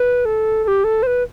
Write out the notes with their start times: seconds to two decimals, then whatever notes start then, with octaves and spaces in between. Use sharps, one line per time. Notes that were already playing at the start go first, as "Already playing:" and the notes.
Already playing: B4
0.25 A4
0.64 A4
0.68 G4
0.84 A4
1.03 C5
1.07 B4